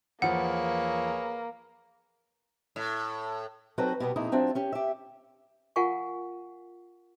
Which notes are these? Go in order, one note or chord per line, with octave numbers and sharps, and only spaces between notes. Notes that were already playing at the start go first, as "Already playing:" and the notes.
E2 F3 A#3 G#4 B4 C#5 F#5
A2
F#3 C4 D#4 F#4 A4 B4
B2 G3 B3
F2 A#2 D#4 E4 G#4
F#3 C4 D4 F4 E5
C#4 G4
G4 E5
F4 A#4 F5 F#5 G#5 C#6